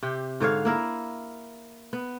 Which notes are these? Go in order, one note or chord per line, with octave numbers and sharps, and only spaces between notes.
C3 G4
G#2 D3 C#5 F5
A#3 E4 A#4
B3